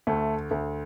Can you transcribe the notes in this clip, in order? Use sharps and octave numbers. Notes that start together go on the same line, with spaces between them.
D2 A3
D2